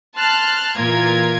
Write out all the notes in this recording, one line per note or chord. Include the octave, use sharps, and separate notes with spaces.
A5 C6 F6 F#6
A#2 E3 A#3 F4 A#4 G#6